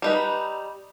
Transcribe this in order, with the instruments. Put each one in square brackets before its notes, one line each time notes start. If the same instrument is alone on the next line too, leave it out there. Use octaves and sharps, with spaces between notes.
[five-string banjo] G3 D#4 B4